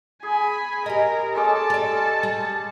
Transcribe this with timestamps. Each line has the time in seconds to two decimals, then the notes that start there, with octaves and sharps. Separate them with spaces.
0.23 G#4 G#5 B5
0.86 G4 A#4 D#5
1.35 G#3 C#4 A4 A5 D6
1.70 G4 D5
2.23 G3